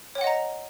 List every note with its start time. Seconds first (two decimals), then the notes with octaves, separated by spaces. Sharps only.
0.15 C#5
0.18 G5
0.21 F#5
0.24 D#5
0.27 A#5